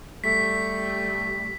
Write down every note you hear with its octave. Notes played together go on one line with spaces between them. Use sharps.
G3 A3 B6